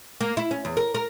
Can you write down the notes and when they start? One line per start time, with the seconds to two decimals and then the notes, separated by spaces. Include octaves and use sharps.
0.21 A#3
0.37 E4
0.51 C#4
0.65 E2
0.77 A#4
0.95 A#4